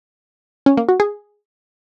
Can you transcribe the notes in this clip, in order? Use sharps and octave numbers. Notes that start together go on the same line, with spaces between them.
C#4
A#3
F#4
G#4